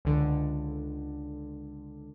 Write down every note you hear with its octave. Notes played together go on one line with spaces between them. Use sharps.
C#2 D3